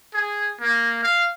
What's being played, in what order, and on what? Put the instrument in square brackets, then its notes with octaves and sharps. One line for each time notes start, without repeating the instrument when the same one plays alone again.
[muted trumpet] G#4
A#3
F5